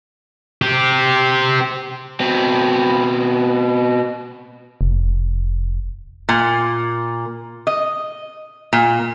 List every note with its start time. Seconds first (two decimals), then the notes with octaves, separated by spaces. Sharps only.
0.62 C4 G4
2.20 B2 C4
4.81 F1
6.29 A#2
7.67 D#5
8.73 A#2